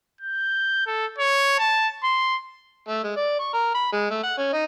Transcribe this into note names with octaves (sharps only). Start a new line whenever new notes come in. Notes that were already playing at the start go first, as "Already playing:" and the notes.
G6
A4
C#5
A5
C6
A3
G#3
D5
C#6
A#4
B5
G#3
A3
F#5
C#4
D#4